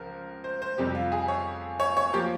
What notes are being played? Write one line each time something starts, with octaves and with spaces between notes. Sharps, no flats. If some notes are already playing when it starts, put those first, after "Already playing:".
Already playing: C#2 F3 A#4
C5
C5
F2 C3 G3 G4
F4
G#4
C#5
C#5
C#5
F3 A#3 G4